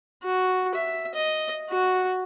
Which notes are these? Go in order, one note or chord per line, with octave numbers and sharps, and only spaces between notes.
F#4
E5
D#5
F#4